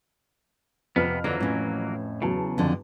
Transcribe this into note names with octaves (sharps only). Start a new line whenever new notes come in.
F2 C3 B3 B4 F6
D3 E3 F#3 A#3
A2 C#4
E2 C#3 F#3 A5
F2 D3